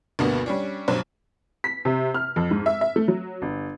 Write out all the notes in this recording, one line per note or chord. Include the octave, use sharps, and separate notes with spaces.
D2 G2 B2 A#3 B3
G3 C#4 D4
B1 G2 F#3 C5
B6
C3
F6
F2
G#2
E5
E5
A3
F#3
G1